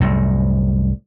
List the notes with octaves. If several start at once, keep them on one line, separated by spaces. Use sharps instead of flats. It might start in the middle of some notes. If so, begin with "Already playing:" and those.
C2 F#2 A2